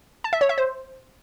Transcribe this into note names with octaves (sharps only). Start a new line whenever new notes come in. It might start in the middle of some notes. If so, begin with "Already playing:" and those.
A5
E5
C#5
E5
C5